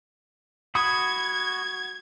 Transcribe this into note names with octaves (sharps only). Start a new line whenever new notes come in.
F#4 B5 D#6 G#6